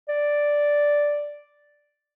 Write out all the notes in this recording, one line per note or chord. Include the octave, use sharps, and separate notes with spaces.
D5